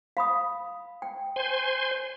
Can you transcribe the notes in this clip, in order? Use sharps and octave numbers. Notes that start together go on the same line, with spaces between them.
F5 B5 D#6
G5
C5 G#5 C6